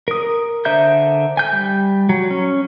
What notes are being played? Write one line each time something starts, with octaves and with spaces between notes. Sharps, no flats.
A#4 D#6
D3 C5 E5 A#5 G6
G#5 G6
G3
F#3
C#4